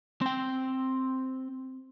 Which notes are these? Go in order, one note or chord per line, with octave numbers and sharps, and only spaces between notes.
C4 G5